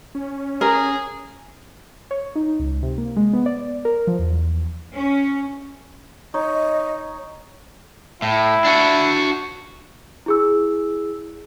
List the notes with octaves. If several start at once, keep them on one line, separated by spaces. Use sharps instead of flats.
C#4
G#4 A#4
C#5
D#4
C#2
C3
A#3
G#3
B3
D5
A#4
F3
E2
C#4
D#4 C#5 D#5
A2 E4
D4 F#4
E4 G#4 E6